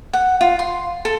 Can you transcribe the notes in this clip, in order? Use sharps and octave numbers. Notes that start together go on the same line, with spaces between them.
F#5
F4
C6
A4